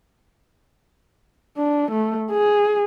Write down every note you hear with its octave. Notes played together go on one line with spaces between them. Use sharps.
D4
A3
G#4